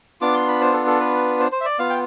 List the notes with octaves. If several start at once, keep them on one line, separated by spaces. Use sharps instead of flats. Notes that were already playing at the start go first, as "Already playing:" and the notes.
B3 D4 F4 D6
C6
B5
C5
A4
A4
B4
C5
C5
E5
D5
B3 F4 F5
G5